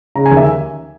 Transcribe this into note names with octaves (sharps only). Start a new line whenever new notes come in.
C#3 A#5
G#5
D#2
E5